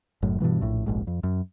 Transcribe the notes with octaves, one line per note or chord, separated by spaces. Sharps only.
F#1 F#2 A2
G2 B2 E3 F#3
A#1 A2
F1 A#1 G#2
F2
F#2